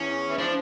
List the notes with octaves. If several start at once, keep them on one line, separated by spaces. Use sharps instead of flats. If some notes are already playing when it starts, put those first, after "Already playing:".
Already playing: E2 C#4
E3
F3 D4